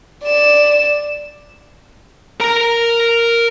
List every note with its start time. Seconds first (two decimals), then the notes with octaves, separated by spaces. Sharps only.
0.24 D5 E7
2.40 A#4 A#5